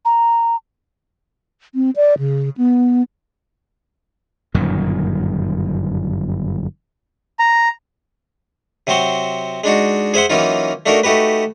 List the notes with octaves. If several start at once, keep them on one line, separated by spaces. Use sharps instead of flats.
A#5
C4
D5
C#3
B3
G1 F#2 A#2 D#3
A#5
C3 F#3 C4 F#4 C6
G#3 D4 D#4 F#4
G#4 C5 E5 F#5 C6
E3 F#3 A#3 C#4 D#4 F4
A3 D4 D#4 F#4 A#4
A3 D#4 F#4 G4 B4